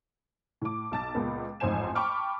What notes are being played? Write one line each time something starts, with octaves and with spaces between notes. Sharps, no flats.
A2 D6
B1 A5 A6
C#2 A#2 G#3 A#3 B3
A1 F2 G#2 C5 G#5 E7
G5 A5 B5 C#6 D6 F6